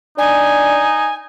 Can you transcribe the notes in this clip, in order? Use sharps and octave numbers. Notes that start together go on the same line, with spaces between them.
D4 D#4 G#5